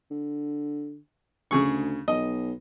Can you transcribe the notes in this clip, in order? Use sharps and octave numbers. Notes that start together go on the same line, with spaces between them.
D3
D2 C#3 G#4 C#6
B1 D#5